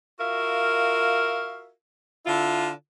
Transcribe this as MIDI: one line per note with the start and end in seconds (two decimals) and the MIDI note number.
0.20 1.71 65
0.20 1.71 66
0.20 1.71 70
0.20 1.71 76
0.20 1.71 77
2.26 2.70 50
2.26 2.70 64
2.26 2.70 65